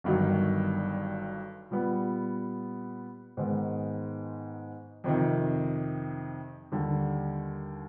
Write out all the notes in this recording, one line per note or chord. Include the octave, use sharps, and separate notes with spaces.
G1 G2 D#3 F#3
A#2 G3 B3
G#2 D#3 G#3 B3
F2 C3 D#3
D#2 D3 G3